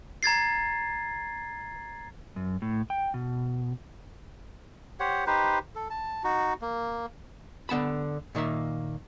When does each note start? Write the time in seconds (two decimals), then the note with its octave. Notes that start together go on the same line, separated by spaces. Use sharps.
0.23 A#5 G#6 A6 C7
2.36 F#2
2.62 A2
2.90 G5
3.14 B2
5.00 G4 C5 C#5 F#5
5.27 D#4 G4 B4 C5
5.76 A4
5.90 A5
6.24 D#4 F#4
6.62 A#3
7.69 D3 B3 A5 B5
8.35 A#2 D#3 A#3 E5